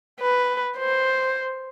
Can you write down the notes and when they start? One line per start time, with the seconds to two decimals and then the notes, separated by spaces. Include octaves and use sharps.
0.21 B4
0.78 C5